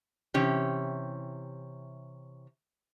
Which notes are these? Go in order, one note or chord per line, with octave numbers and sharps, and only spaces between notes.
C3 E3 C#4 G4